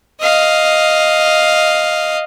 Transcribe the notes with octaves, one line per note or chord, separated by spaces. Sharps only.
D#5 F5